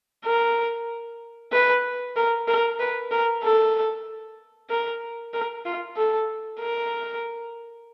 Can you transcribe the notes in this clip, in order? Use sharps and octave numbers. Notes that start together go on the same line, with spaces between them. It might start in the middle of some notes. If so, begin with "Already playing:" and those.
A#4
B4
A#4
A#4
B4
A#4
A4
A#4
A#4
F4
A4
A#4